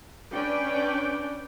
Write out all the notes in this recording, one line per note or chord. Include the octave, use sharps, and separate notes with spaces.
C#4 D4 B4 D5 G5